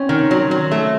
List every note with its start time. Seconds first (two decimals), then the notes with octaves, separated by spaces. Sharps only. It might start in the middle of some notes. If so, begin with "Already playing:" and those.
Already playing: C4 C#4
0.09 D#3
0.31 F#3
0.51 F#3
0.71 A3